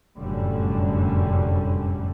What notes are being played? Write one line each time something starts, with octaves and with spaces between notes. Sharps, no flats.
F1 F#2 A2 D3 G3 C#4